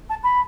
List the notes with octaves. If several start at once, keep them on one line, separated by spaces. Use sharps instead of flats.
A5
B5